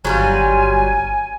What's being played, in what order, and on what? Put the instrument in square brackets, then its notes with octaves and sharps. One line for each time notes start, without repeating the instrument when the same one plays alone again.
[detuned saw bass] G1 [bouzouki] F#3 G3 F4 [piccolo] G#5